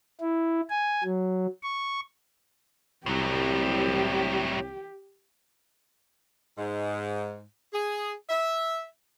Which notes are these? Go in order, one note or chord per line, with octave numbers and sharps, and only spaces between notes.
E4
G#5
F#3
C#6
C2 A2 F#3 G4
G#2
G#4
E5